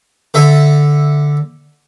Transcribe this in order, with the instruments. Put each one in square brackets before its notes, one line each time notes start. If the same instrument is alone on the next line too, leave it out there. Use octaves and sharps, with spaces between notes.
[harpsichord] D3 A4 E5